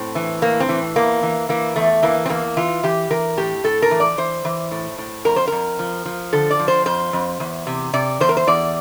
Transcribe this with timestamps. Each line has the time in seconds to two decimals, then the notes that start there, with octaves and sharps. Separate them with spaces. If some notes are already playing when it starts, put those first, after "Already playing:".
Already playing: A2 C4
0.15 E3
0.42 A2 A#3
0.60 C4
0.69 E3
0.96 E2 A#3
1.23 E3
1.49 E3 A#3
1.76 E2 A3
2.03 E3 A#3
2.26 C4
2.29 E2 A#3
2.57 E3 F4
2.83 E3 G4
3.10 E3 A#4
3.37 A2 G4
3.64 A2 A4
3.82 A#4
3.91 E3
4.00 D5
4.18 E3 C5
4.45 E3
4.71 A2
4.98 A2
5.25 F2 A#4
5.36 C5
5.47 F2 A#4
5.79 F3
6.05 F3
6.33 D3 A4
6.51 D5
6.59 F3
6.68 C5
6.86 F2 C5
7.13 F2
7.40 E2
7.67 C3
7.94 C3 D5
8.20 E2 C5
8.29 A#4
8.37 C5
8.47 E2 D5